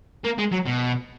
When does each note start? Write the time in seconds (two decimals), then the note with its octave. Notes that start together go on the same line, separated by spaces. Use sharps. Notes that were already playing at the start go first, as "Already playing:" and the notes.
0.25 A#3
0.39 G#3
0.52 F#3
0.67 B2